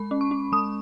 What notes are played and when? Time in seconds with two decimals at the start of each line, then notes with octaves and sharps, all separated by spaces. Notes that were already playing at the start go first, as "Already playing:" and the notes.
Already playing: G#3 B5
0.11 C#4
0.21 C#6
0.31 C#4
0.52 G#3 D#6